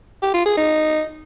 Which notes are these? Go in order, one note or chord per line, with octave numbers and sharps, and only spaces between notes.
G4
F4
G#4
D#4